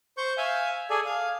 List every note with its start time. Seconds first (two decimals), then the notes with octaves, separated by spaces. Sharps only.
0.18 C5 C#6 G6
0.38 E5 F5 G#5
0.90 G#4 A4 D5 G#5
1.06 F5